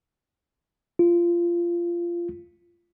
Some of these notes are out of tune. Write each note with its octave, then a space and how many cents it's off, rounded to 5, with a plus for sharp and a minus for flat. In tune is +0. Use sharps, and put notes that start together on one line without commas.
F4 -20